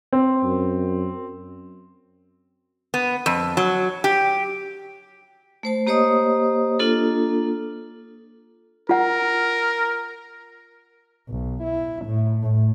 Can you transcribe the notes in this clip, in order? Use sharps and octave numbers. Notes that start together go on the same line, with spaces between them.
C4
F#2
B3
F2
F#3
G4
A3 C5 A5
A#3 G4 C5 C#5 D#5 D#6
A#3 D4 F4 A4
F4 A#4 F#5
B1
E4
A2
A2